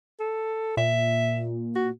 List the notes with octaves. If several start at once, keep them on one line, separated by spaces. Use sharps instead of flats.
A4
A#2 E5
F#4